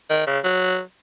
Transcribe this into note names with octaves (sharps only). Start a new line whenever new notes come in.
D#3
C#3
F#3